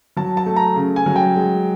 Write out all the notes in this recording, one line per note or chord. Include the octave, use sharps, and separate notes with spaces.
F#3 A5
A5
A3
A#5
C#3
G#5
F#3
G5
G#3